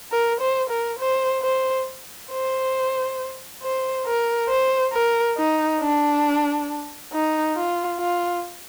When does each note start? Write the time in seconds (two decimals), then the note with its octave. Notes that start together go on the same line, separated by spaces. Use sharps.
0.12 A#4
0.41 C5
0.70 A#4
0.99 C5
1.43 C5
2.31 C5
3.62 C5
4.06 A#4
4.49 C5
4.93 A#4
5.38 D#4
5.80 D4
7.13 D#4
7.56 F4
7.99 F4